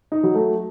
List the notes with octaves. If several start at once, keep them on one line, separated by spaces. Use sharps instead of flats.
D#4
F#3
A3